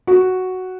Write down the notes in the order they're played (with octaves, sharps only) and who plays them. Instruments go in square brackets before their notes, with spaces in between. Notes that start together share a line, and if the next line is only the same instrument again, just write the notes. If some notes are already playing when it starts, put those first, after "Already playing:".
[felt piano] F#4